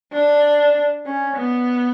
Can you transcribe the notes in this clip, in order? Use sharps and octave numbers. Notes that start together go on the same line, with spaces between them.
D4
C#4
B3